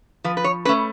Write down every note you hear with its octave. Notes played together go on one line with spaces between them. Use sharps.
F3 B4
B4
C#5
A3 C#4 B4